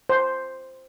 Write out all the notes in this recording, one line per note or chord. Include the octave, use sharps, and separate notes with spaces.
C5